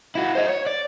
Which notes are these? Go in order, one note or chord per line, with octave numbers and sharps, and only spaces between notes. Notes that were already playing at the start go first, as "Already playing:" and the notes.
E4 F#4
C5 D#5
C#5
D5